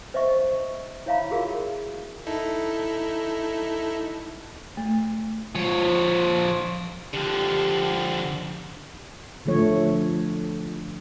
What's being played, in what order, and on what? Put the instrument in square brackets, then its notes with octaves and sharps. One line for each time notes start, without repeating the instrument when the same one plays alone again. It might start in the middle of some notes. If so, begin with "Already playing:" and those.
[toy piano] C5 D#5 E5 C#6
E4 C#5 E5 F5 A#5 B5
F4 F#4 G#4 A#4 F5
[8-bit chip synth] D#4 E4 A4
[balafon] A3
[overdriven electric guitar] F3 C#5
[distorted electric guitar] D3 F3 [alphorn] G4
[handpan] D3 F3 A3 C#5